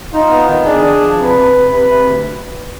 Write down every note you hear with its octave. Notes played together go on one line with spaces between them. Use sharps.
D#4 F4
B3
D#3
D4 G#4
D4
F3
C3 B4
C3
C3
C3 B4
C3
D2